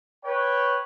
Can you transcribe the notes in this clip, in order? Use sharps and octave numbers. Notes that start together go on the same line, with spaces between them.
B4 C#5 G5